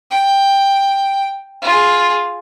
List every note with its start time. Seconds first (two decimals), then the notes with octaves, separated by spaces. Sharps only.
0.11 G5
1.62 F4 G#4